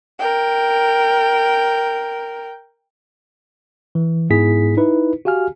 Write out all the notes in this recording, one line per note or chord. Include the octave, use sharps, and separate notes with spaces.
A#4 G5
E3
G#2 B3 E4 G#4 B6
D#4 E4 B4
F#4 G4 F5 G#5 F6